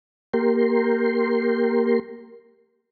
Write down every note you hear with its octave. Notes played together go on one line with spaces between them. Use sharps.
A#3 G4 A#4 C6